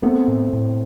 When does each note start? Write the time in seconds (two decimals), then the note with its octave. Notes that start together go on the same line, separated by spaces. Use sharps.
0.02 A3 B3 C4
0.28 A2
0.53 A2